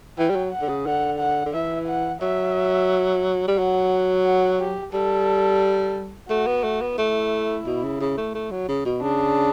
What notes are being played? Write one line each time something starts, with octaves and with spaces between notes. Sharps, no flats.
E3 G5
G3
F#3
F#5
D3
C#3
D3 F#5
F#5
D3
E3 E5
F#5
F#3 E5
G3
F#3 F#5
F#5
G4
G3 A4
A3 F#4
B3
A3
B3
A3 E4
B2
C#3
C#3
A3
A3
F#3
C#3
B2
C#3 D4